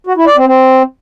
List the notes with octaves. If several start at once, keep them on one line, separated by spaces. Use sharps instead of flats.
F#4
E4
D5
C4
C4